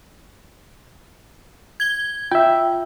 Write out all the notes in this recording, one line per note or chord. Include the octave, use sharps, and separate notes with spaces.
G#6 G7
F4 E5 G5